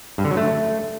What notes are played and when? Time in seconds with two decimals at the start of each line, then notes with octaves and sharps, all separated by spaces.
0.18 G2
0.24 D3
0.31 F#3
0.37 A3